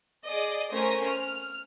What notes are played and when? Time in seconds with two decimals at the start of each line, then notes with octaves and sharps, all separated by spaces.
0.25 G#4 D5 D#5
0.71 A3 C#4 A#4 C5 G#5 A#6
1.08 F6